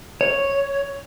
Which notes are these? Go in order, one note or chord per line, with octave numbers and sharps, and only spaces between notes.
C#5